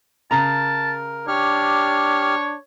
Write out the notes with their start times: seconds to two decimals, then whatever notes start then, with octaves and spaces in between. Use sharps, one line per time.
0.31 C#3 A#4 A5 A#5
1.28 D4 G4 C#5 F6